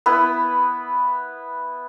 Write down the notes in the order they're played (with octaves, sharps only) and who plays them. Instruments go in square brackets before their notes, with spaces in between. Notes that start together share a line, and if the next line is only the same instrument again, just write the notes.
[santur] B3 E4 B4